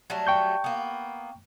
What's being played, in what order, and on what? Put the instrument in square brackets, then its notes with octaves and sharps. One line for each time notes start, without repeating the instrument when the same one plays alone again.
[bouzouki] F#3 G3 A3
[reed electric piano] G5 C#6 G6
[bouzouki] A#3 B3